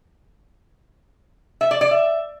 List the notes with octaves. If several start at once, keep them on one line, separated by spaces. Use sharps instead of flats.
E5
D5
D5
E5